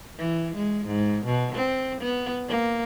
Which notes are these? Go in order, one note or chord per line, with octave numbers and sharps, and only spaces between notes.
E3
G#3
G#2
B2
C4
B3
A#3